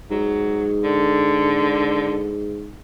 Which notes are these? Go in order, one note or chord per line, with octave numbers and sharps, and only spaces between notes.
G#2 F#3
D3